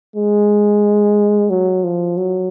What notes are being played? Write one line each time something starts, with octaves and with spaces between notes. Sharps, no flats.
G#3
F#3
F3
F#3